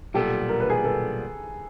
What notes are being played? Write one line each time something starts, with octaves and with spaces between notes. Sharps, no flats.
B1 A#2 G3 B3 G4 A4
A#4
B4
G#4 A#4
A4 B4